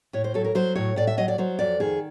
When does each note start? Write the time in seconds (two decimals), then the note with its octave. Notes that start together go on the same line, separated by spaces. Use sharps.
0.13 A2 C#5
0.24 C5
0.34 F#3 A4
0.44 A#4
0.55 F#3 C5
0.75 A2 C#5
0.96 A2 D5
1.07 E5
1.17 F#3 D#5
1.28 D5
1.38 F#3 C5
1.59 F2 D5
1.80 D#3 G#4